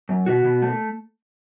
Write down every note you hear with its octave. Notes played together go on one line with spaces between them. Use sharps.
F#2
B2 F#4
B2
A3